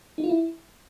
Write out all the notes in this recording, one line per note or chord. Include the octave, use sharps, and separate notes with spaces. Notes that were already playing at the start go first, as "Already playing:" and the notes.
D#4
F4
E4